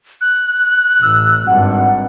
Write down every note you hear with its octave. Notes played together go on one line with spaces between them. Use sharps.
F#6
A1 E6
G#1 G2 F#5